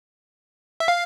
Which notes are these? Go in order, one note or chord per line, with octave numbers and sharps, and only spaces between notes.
E5
F5